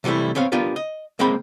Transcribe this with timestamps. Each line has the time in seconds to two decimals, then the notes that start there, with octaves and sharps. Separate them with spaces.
0.04 C3 E3 G3 A3 E4
0.35 B3 C4 C#5 F5
0.52 B3 D4 F4 G4 A#4
0.76 D#5
1.19 C#2 G#3 A#3 C4 G5 B5